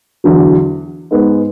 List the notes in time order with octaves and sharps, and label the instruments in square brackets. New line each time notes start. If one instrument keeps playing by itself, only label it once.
[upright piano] E2 D3 F#3
G#2 G#3 B3